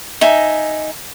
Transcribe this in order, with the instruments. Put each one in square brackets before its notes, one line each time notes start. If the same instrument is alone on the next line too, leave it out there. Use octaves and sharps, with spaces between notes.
[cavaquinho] D#4 E5 G#5 A#5